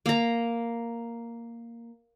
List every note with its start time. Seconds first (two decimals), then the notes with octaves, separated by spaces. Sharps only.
0.06 A#3 A#5